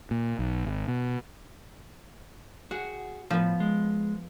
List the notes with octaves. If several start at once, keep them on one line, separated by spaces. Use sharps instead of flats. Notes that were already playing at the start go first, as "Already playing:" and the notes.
A#2
B1
G#1
B2
F#4 G#4 F#5
A2 F3 B3
G#3